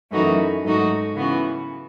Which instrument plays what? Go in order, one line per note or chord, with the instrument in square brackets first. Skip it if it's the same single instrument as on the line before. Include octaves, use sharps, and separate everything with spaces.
[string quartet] F#2 E3 A3 D#4 F#4
G#2 F#3 A3 D#4 F#4
C#3 E3 B3 F#4